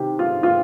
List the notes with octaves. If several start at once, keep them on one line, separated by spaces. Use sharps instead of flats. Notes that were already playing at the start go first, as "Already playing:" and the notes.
Already playing: C3 D#3 G4
F4
F4